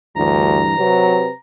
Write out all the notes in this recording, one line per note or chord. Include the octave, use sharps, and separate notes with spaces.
D2 G2 E3 A#5
C3 F#3 B4